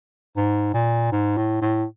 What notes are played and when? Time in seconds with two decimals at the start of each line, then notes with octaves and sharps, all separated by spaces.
0.36 G#2
0.74 A#2
1.12 G#2
1.37 A2
1.61 A2